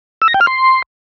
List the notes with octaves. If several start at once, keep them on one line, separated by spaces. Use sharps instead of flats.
E6
A#6
G5
F6
C6